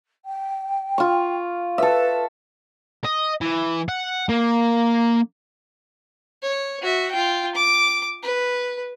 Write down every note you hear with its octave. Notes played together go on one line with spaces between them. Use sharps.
G5
F4 C#6
A4 B4 E5
D#5
E3
F#5
A#3
C#5
F#4 E5
F4 G5
D6
B4